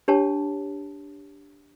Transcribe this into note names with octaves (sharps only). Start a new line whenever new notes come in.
D4 G4 C#5 A5